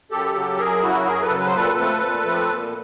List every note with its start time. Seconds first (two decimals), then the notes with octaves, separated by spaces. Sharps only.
0.10 F#2 G4 A4
0.34 C#3 F#3
0.58 F#2 G#4 A#4
0.83 C#3 F#3 E4 F#4
1.06 F#2 G#4 A#4
1.22 A4 B4
1.30 C#3 F#3
1.39 B4
1.47 C5
1.54 A#2 A4 B4
1.77 F3 A3 C4
2.02 A#2
2.25 F3 A3 C4
2.49 A#2